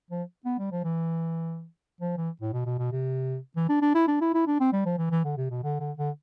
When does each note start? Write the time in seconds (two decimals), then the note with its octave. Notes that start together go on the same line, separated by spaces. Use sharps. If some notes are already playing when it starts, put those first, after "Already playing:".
0.10 F3
0.45 B3
0.59 G3
0.72 F3
0.84 E3
2.01 F3
2.18 E3
2.41 A2
2.53 B2
2.66 B2
2.79 B2
2.92 C3
3.56 E3
3.69 D4
3.82 D4
3.94 E4
4.08 D4
4.21 E4
4.34 E4
4.47 D4
4.60 C4
4.73 G3
4.86 F3
4.98 E3
5.11 E3
5.24 D3
5.37 C3
5.50 B2
5.63 D3
5.80 D3
5.98 D3